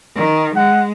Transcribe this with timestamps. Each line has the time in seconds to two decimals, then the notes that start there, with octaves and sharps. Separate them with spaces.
0.16 D#3
0.56 G#3 F#5